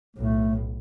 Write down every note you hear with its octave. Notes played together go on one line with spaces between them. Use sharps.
B1 A2 A3